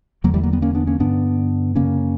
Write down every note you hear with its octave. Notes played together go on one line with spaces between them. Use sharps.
E2 D3 F#3 A#3
E3 G3
F#3 A#3
G3 B3
A#3 C#4
B3 D4
A#3 C#4
G2 D3 B3 D4
F#2 C#3 A#3 C#4